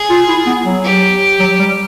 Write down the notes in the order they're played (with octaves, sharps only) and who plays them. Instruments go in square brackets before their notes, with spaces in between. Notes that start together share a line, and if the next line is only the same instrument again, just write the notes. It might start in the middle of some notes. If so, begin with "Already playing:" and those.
Already playing: [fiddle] G#4
[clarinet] F4
E4
B3
F#3
[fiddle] G4
[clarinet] F#3
G3